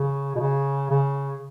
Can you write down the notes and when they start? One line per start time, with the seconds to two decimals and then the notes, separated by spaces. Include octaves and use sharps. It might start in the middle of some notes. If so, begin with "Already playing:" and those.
Already playing: C#3
0.36 B2
0.40 C#3
0.91 C#3